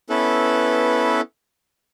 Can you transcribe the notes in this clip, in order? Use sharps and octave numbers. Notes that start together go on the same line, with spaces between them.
B3 C#4 E4 A4 B4